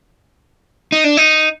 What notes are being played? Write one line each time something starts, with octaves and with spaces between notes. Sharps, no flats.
D#4
D4
D#4